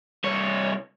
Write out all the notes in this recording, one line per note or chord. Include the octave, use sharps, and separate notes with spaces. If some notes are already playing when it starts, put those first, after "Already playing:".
C2 C#5